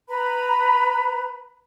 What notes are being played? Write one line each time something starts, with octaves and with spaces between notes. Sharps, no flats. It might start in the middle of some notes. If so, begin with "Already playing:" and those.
B4 A#5 B5